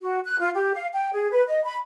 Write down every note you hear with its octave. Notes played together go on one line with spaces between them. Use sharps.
F#4
F#6
F4
G4
F5
G5
G#4
B4
D#5
B5